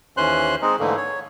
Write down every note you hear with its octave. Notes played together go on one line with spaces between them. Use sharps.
D#2 E3 C#4 C5 C6 F#6
G#3 C4 D#4
G#2 D3 E3 A3 A#3
C#5